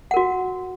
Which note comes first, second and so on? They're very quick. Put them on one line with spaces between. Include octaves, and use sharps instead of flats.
F#5 A#4 F#4